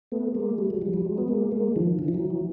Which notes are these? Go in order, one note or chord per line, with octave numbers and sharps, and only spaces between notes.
A3 B3
G#3 A#3
G3 A3
F#3 G#3
F3 G3
F3 G3
F#3 G#3
B3
G#3 A#3
G#3 A#3
D#3 F3
D3 E3
F3
E3 F#3
E3 F#3